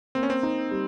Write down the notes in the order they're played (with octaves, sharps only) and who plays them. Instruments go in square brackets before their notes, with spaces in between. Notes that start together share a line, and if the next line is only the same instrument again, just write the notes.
[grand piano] A#3 [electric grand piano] C4
[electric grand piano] C#4
C4
[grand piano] D#4
G3